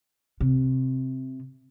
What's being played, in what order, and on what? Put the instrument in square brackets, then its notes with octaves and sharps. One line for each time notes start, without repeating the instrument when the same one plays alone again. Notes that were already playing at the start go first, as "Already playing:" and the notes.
[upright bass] C3